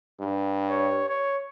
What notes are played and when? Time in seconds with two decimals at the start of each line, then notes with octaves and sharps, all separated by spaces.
0.20 G2
0.70 C#5
1.09 C#5